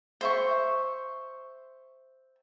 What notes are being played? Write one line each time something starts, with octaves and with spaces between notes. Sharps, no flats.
C5 E5 C#6